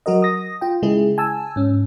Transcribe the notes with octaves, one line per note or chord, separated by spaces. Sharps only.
F#3 F#4 A#4 D#5
D#6 A#6
F4 G5
C#3 G#3 E4 G#4
G#5 A5 E6
G#2 C#4